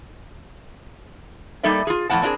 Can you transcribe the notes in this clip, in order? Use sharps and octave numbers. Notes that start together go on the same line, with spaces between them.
G3 A#3 D#4 A4 D5 E5
F4 G#4
F2 A2 C4 E4 F#5 A5
C4 D4 D#4 F4 G#4 A#4